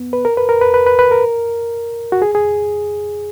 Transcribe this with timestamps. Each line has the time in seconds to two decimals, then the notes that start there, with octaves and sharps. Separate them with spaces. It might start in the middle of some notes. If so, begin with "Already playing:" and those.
Already playing: B3
0.13 B4
0.25 A#4
0.37 B4
0.49 A#4
0.61 B4
0.74 B4
0.86 B4
0.99 B4
1.11 A#4
2.12 F#4
2.22 G#4
2.35 G#4